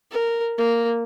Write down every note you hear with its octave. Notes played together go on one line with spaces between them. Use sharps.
A#4
A#3